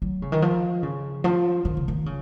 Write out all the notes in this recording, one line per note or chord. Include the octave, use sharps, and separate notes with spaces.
F#3
C#3
D#3
F3
C#3
F3
D#3
C#3
D#3
C#3